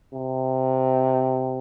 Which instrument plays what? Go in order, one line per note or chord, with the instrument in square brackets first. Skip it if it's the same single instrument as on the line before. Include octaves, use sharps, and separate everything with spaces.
[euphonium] C3